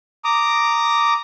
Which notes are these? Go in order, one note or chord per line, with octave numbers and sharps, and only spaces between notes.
A#5 D6 D#6